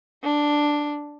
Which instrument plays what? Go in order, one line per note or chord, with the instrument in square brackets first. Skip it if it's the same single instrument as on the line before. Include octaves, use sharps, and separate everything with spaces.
[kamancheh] D4